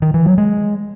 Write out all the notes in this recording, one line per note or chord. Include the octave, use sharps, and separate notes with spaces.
D#3
E3
F#3
G#3